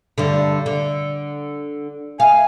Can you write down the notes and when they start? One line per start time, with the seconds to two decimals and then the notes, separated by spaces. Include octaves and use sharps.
0.18 G2 D3
0.66 D3
2.20 F5 G#5